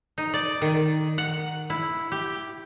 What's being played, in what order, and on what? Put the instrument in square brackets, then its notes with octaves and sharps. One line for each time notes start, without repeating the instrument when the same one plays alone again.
[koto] D#4
D5
D#3
F#5
E4
G4